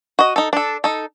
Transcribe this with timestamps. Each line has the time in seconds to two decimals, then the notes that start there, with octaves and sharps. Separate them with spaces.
0.19 F#4 D#5
0.36 D#4 A4
0.53 D4 A4
0.84 D#4 A4